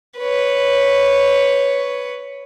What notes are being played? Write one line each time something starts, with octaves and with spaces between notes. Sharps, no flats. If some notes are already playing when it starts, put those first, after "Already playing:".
B4 C#5